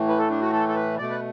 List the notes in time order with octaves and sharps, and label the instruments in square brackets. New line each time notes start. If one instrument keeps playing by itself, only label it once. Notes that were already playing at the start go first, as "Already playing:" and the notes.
Already playing: [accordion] A2 E3 A3
B4
A4
D4
F#4
A4
A4
B4
B2 A3 D5
B4